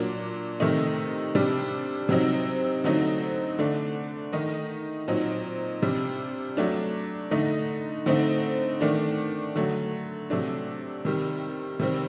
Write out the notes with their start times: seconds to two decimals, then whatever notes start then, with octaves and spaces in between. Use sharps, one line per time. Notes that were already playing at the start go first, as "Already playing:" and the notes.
Already playing: A#2 F#3 A#3 D4
0.60 C3 D#3 A3 D#4
1.35 C3 G3 D4
2.09 C3 F#3 C4 D#4
2.84 D3 F#3 A3 C4 D#4
3.59 D3 A3 D4
4.33 D#3 A3 D#4
5.08 A#2 F#3 C4 D#4
5.82 C3 G3 D4
6.57 F#3 A3 D4
7.31 D3 A3 D#4
8.06 D3 A3 C4 D#4
8.81 D#3 A3 D4
9.56 D3 F#3 A3
10.30 C3 F#3 A3 D4
11.05 C3 D#3 G3
11.79 C3 D#3 G3 C4